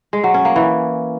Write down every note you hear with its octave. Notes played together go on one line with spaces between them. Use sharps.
G#3
F#3
C#4
A#3
E3